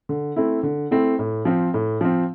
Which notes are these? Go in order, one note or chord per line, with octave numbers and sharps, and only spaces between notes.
D3
A3 C4 E4
D3
A3 C4 E4
A2
F3 C4
A2
F3 C4